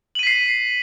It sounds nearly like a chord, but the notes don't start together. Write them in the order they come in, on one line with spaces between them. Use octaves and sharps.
F#7 D#7 B6 C7